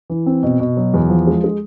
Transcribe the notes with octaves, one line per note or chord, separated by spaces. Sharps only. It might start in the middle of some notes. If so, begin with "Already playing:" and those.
E3
C4
B2
B2
F#3
E2
F3
G#3
G#3